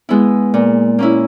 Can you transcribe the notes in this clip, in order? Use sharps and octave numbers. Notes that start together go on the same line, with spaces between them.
G#3 B3 E4
A#2
A#3 C#4 E4